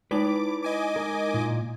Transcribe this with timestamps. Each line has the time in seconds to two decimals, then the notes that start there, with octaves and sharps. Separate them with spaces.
0.11 G#3 D#4 E4 B4 D6
0.63 D#5 G#5 D6
0.96 A#4
1.34 A#2